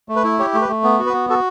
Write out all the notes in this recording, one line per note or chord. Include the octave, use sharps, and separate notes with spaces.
A3
B4
E4
G4 C#5
A3
B4
A3
B3
F#4
B4
B3
F#4 A4